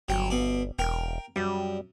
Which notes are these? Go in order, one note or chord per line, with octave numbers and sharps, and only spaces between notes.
G1 F#3 G5
B2 D5
E1 A#4 G5
F#2 G3